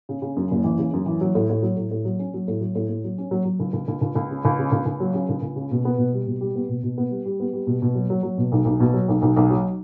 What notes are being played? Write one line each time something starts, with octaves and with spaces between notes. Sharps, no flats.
C#3
C#3
F#2
F#1
E3
C#3
F#2
E3
F#3
A2
A2
F#3
A2
A2
F#3
C#4
F#3
A2
F#3
A2
A2
F#3
C#4
F#3
F#3
C#2
C#2
C#2
C#2
C#2
C#3
C#2
C#3
C#2
C#2
F#3
C#3
C#2
C#2
C#3
B2
B3
B2
G3
B2
G3
B3
B2
B2
B3
G3
G3
B3
G3
B2
B2
F#3
F#3
F#3
B2
B1
B1
B2
F#3
B1
B1
B1
F#3